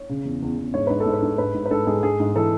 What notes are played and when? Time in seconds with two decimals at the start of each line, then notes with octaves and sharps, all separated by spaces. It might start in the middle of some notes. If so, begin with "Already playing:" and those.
Already playing: C#5
0.09 C#3
0.25 E2
0.42 E2
0.57 E2
0.74 G#2 C#5
0.87 G#2 B4
1.00 A4
1.06 G#2
1.13 B4
1.22 G#2
1.38 G#2 B4
1.54 G#2
1.65 B4
1.71 G#2 A4
1.87 G#2 G#4
2.03 G#2 G#4
2.20 G#2
2.36 E3 A4